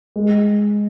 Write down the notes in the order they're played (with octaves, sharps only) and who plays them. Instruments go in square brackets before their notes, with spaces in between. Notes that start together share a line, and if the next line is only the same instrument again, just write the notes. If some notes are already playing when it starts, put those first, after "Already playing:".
[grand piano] G#3